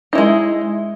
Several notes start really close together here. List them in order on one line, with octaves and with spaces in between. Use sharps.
D#4 E4 G#3